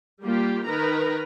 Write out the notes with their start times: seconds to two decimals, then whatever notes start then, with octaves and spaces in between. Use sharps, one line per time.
0.22 G3 A#3 F4 G4
0.66 D#3 A#4 B4 A#5